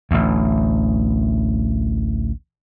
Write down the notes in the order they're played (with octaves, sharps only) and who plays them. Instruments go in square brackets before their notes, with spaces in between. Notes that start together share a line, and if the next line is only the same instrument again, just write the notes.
[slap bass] A1 D2